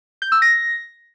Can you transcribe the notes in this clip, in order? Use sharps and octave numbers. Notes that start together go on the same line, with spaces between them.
G6
E6
A#6